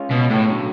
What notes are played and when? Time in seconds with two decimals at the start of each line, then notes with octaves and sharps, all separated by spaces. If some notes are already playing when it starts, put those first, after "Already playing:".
Already playing: G#3 C#4 F4 G#4
0.11 B2
0.30 A2
0.50 D3 F#3